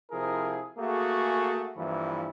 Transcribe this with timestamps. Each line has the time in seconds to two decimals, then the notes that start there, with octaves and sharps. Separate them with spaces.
0.10 C3 F3 E4 G#4 A#4
0.78 A3 A#3 F#4 G#4
1.76 G2 E3 F3 A#3 E4